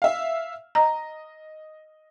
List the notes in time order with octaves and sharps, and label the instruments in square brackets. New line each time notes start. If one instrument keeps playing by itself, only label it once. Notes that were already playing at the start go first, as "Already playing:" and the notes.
[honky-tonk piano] E5 F5
[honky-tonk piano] D#5 [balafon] A#5